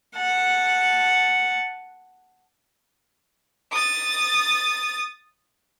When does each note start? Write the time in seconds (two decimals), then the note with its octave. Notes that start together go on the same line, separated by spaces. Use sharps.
0.16 F#5 A5
3.72 D#6 A6